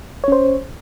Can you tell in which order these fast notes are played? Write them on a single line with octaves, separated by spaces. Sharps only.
C#5 C#4 C5